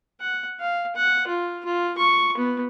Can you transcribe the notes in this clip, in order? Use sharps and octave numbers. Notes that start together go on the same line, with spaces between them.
F#5
F5
F#5
F4
F4
C#6
B3